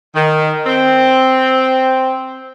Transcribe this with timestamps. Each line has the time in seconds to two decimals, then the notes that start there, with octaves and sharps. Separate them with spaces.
0.14 D#3
0.66 C4